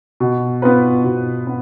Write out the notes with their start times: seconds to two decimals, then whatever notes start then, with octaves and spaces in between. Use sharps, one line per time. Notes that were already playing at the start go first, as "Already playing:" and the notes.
0.20 B2
0.62 B3 F4 B4
1.04 B2
1.47 B3